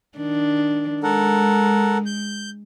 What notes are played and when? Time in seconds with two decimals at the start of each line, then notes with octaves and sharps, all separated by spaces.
0.18 D#3 D4
1.03 G#3 A4 A#4 F#5
2.06 G6